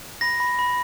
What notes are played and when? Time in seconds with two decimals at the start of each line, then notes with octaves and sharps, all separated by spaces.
0.21 B5 A#6
0.40 B5
0.59 B5